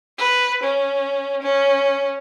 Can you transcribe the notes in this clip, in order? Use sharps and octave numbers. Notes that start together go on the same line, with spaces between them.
B4
C#4
C#4